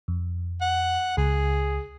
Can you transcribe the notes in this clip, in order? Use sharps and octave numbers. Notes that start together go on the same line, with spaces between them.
F2
F#5
C#2 G#4